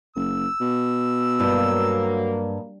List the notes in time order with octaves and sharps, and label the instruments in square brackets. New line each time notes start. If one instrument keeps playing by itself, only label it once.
[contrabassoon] F#1 [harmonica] E6
[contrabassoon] B2
[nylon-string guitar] G2 [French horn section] F#3 A#3